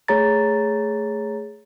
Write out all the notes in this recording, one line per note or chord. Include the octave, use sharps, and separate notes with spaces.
A3 G#4 C#5 A#5 A6